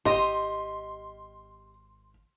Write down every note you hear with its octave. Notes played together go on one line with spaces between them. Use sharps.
G#1 G4 D#5 C6